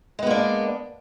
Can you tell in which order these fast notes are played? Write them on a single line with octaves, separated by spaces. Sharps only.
G#3 B3 A#3 D4